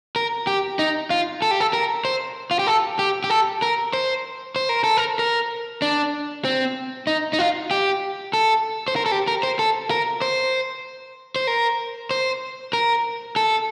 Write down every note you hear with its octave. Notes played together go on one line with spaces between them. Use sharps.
A#4
G4
D#4
F4
A4
G4
A4
A#4
C5
F4
G4
A4
G4
G4
A4
A#4
C5
C5
A#4
A4
A#4
A#4
D4
C4
D#4
D#4
F4
G4
A4
C5
A#4
A4
G4
A#4
C5
A4
A#4
C5
C5
A#4
C5
A#4
A4